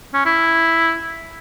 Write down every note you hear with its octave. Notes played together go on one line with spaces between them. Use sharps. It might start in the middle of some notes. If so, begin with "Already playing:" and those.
C#4
E4